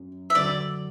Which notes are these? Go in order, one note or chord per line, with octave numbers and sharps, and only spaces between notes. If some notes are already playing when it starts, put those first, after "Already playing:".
Already playing: F#2
E5
D3 F#3 D5